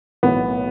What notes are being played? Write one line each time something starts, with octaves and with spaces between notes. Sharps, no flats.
B1 A2 E3 B3